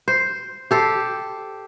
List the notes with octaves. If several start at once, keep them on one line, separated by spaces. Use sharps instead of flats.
C5
G4 A4 C5